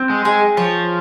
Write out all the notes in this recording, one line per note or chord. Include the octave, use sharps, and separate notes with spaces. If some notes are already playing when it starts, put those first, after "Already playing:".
Already playing: C4
G#3
G#3 G#4
F3 C#5